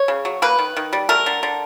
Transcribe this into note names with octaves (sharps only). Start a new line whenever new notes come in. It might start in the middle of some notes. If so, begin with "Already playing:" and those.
Already playing: C#5
C#3
F#3
A#3 B4
D#3
D#3
G3
A3 A#4
D3
D3